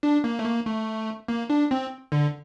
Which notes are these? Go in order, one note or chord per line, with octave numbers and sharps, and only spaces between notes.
D4
A#3
A3
A#3
A3
A#3
D4
C4
D3